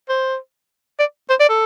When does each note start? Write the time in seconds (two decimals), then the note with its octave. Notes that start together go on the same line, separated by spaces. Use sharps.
0.09 C5
0.99 D5
1.30 C5
1.40 D5
1.49 A4